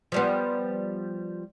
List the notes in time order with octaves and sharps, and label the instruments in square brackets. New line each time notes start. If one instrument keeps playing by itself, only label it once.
[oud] F3 G3 B3